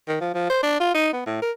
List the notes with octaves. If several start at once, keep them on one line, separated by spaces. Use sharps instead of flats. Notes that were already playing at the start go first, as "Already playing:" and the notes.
D#3
F3
F3
C5
D4
F4
D#4
B3
A2
A#4